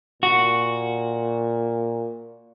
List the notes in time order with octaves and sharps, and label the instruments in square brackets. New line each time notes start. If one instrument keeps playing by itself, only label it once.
[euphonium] A#2 [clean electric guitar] F#4